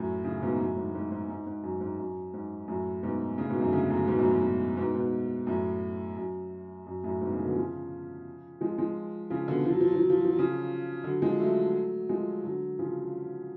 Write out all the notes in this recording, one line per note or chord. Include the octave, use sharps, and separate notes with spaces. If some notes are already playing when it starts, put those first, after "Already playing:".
Already playing: F#2 A2
A2 C#3
G#2 B2
F#2 A2
G#2
G#2
G#2
G#2
G#2
F#2
G#2
F#2
G#2
F#2 A2
G#2 B2
A2 C#3
G#2 B2
F#2 A2
D3
A2 C#3
F#2 A2
G#2 B2
F#2 A2
G#2
G#2
G#2 B2
G#2 B2
F#2 A2
F#2
F#2
F#2 A2
G#2 B2
A2 C#3
B2 D3
C#3 F3
F3 G#3
F3 G#3
C#3 F3
B2 D3
F3
F#3
F3
F#3
F3
F#3
F3
F#3
F3
F#3
C#3 F3
D3 F#3
F3 G#3
F#3 A3
F3 G#3
D3 F#3
C#3 F3